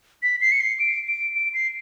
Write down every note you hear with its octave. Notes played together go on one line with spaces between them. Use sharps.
B6
C7
C#7
C7
D7
D7
D7
C7